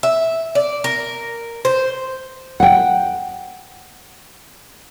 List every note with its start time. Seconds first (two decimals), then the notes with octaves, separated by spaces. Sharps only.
0.03 E5
0.55 D5
0.84 A#4
1.65 C5
2.60 F#5 G5